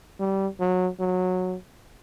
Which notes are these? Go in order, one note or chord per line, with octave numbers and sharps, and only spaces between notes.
G3
F#3
F#3